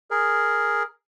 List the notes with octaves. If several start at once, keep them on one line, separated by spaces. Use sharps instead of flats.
G#4 A#4